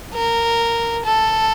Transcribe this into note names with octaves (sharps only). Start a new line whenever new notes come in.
A#4
A4